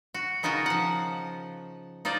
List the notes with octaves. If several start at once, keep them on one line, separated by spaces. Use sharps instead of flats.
F#4
C#3 D#4 F4 F#4 A#4
F3 F#5
D#4 F4 C5 D5